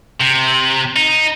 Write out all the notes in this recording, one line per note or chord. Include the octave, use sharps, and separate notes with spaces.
C3
D#4